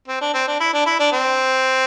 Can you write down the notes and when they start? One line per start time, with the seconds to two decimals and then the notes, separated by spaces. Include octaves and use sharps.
0.08 C4
0.21 D4
0.34 C4
0.47 D4
0.60 E4
0.74 D4
0.86 E4
1.00 D4
1.12 C4